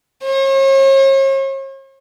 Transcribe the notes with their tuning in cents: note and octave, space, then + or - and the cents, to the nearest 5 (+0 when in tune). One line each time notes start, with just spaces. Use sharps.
C#5 -40